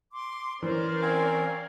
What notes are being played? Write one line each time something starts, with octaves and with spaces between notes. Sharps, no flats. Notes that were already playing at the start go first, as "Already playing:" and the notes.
C6 D6
E3 C#4 A#4 C5 D5
C4 F5 G#5